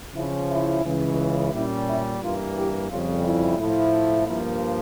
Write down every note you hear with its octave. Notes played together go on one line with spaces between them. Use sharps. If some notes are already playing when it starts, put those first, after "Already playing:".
C#3 F3 C#4 E4
E4
C#2 C#3 E3
A#2 G3 C#4 E4
E4
G2 E3 A#3 F4
E4 G4
F2 C#3 G3 F4
E4
A2 F3 A3 E4
G2 F3 A#3 E4